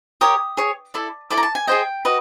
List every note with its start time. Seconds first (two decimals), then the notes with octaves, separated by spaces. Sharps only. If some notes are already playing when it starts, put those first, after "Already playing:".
0.21 G4 A#4 C#5 D#6
0.57 G#4 C#5
0.94 E4 A4 D5
1.30 E4 A4 D5 D6
1.37 A#5
1.43 A5
1.55 G#5
1.67 G#4 C5 D#5 G5
2.05 F#4 B4 D#5